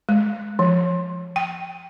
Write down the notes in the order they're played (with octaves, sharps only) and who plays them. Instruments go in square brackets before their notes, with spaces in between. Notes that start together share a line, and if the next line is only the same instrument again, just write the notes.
[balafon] G#3
F3
G5